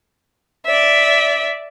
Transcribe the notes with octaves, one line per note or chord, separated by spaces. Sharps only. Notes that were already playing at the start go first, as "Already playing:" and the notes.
D5 E5